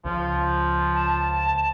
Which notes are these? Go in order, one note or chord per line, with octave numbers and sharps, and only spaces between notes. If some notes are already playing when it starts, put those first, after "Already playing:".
C#2 F3
A5